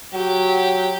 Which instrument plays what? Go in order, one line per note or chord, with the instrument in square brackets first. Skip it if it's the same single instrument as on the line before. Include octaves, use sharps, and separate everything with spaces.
[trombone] F#3 [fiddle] G4